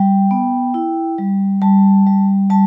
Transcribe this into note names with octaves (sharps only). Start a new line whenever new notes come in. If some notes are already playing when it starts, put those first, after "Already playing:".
Already playing: G3 G5
B3
E4
G3
G3 A5
G3
G3 A5